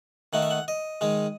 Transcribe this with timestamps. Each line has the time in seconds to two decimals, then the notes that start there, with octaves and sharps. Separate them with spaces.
0.33 D#3 A3 D#4 F#5
0.42 E5
0.51 F#5
0.68 D#5
1.01 D#3 G#3 D#4